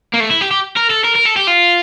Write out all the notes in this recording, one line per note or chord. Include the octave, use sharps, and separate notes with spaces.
A#3
A3
E4
G4
G4
A#4
A4
A#4
A#4
A4
G4
F4